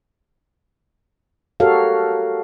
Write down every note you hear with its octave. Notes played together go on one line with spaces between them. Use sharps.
F#4 G4 A4 A#4 C#5 F5